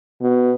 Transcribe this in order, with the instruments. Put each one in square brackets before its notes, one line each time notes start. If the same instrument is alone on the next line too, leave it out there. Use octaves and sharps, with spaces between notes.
[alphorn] B2